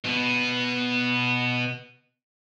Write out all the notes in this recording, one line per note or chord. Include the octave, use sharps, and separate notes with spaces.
B2 B3